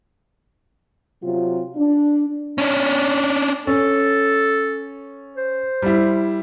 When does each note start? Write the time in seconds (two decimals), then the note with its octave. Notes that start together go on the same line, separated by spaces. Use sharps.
1.22 C3 F#3 C4 F4
1.75 D4
2.58 C#4 D4
3.67 C#4 A4
5.36 C5
5.82 G3 E4